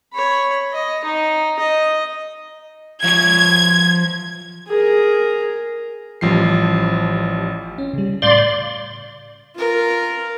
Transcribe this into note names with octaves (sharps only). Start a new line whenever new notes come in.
C#5 B5
D#5
D#4
D#5
F3 C#5 G#6
G#4 A#4
A1 F3 G3 C7
C#4
C#3 G3
C#3
A2 D5 F5 C6 G6
F4 A#4